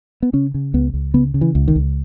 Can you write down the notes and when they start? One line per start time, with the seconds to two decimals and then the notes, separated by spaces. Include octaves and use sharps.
0.22 B3
0.33 C#3 C#4
0.54 C#3
0.74 C#2 B3
0.94 C#2
1.14 C#3 B3
1.34 C#3
1.41 E3
1.55 C#2
1.68 D#3
1.76 C#2